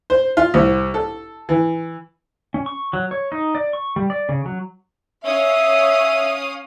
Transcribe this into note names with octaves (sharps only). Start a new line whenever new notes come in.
C5
F4
C2
A4
E3
C#4
C#6
F#3
C#5
D#4
D5
C#6
G3
D5
C#3
F#3
C#4 E5 F5 D#6